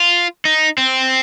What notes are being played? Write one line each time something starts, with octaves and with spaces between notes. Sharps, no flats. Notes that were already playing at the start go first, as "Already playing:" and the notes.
Already playing: F4
D#4
C4